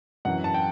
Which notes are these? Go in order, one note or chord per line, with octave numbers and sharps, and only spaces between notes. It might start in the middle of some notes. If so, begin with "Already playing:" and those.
F#2 E3 F#5
A5
G5